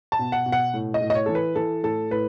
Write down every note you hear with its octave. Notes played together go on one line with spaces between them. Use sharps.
A5
B2
F#5
B2
F#5
A2
D#5
A2
D#5
C#5
E3 A4
B4
E3 A4
A2 A4
A2 B4